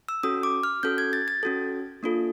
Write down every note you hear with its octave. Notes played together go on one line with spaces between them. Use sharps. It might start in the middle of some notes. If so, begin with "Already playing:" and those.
E6
C#4 F#4 A4 D#6
D6
F6
C#4 F#4 A4 G6
G#6
A6
A6
C#4 F#4 A4
A#3 D4 F4 A4